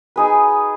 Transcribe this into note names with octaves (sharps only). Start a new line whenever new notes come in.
D#4 G#4 B4